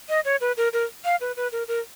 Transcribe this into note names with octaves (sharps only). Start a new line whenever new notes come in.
D#5
C#5
B4
A#4
A#4
F5
B4
B4
A#4
A#4